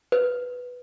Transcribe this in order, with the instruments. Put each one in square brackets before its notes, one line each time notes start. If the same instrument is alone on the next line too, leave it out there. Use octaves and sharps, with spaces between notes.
[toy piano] B4